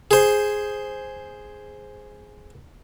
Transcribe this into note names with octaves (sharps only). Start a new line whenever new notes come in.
G#4 C5